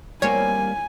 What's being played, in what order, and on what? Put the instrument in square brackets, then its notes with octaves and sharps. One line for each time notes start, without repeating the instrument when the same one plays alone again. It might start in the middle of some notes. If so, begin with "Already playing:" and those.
[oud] G3 A#3 C4 [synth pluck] C#5 [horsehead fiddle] G#5